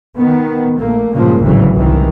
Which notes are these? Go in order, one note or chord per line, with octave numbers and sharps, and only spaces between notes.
D#3 B3
A#1 A3 A#3
G2 A#2 C#3 F3 G#3 A#3
G#1 D2 A2 C#3 E3 F#3
C2 D#3 E3